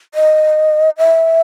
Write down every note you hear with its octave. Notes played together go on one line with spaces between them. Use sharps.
D#5
E5